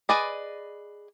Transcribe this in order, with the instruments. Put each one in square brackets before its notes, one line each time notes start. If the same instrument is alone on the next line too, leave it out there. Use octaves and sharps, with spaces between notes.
[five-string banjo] G#4 B4 D5 D#5